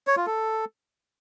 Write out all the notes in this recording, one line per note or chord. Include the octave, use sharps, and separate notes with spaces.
C#5
F4
A4